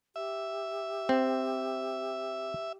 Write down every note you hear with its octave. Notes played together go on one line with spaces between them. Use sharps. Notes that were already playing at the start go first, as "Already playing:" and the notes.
G4 E5
C4